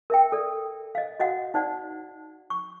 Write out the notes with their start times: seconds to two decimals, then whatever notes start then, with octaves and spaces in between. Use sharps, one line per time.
0.10 A#4 E5 G5
0.32 A4 D5
0.95 D#5 F5
1.20 F#4 D#5 F5 F#5
1.54 D#4 C5 D5 F#5
2.50 C#6